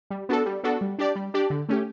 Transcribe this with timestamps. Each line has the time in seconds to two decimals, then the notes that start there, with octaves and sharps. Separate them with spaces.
0.10 G3
0.29 B3 D4 F#4 A4
0.46 G3
0.63 B3 D4 F#4 A4
0.81 G3
0.98 D4 G4 D5
1.16 G3
1.34 D4 G4 D5
1.50 D3
1.69 A3 C#4 G4